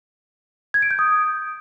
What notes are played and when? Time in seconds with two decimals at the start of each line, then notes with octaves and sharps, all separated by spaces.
0.74 G#6
0.82 D7
0.91 G6
0.99 D#6